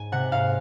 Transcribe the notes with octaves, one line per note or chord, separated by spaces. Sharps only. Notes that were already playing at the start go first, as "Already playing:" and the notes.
Already playing: G#2 G#5
C3 F#5
G#2 F5